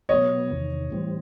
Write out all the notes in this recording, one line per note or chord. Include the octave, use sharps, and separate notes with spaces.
B2 F#3 B3 C#5 D#5
E2 C3 D#3
A2 E3 G3 C4